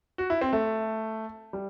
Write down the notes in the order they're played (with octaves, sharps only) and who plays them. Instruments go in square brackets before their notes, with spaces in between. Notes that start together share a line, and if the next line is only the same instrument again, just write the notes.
[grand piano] F#4
E4
C4
A3
G3